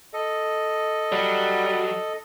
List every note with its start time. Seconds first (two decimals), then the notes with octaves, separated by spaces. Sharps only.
0.13 A4 D#5
1.12 F#3 G3